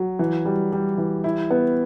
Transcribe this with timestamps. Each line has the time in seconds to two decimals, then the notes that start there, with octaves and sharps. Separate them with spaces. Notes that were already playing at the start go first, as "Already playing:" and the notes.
Already playing: F#3
0.19 E3
0.45 G3
0.72 G3
0.98 E3
1.24 E4
1.51 B3